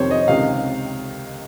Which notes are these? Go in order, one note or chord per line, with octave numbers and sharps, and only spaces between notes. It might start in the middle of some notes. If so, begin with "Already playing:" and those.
Already playing: F2 C3 D#3 C5 C#5
D#5
C#2 C3 D#3 F5